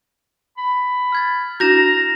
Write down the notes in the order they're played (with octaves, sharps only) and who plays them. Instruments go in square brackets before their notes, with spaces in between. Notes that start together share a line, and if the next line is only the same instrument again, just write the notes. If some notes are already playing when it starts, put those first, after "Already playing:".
[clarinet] B5
[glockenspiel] F6 G#6 A6
[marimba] D4 E4 F#4 [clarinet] A#5 [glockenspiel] G6 A#6 E7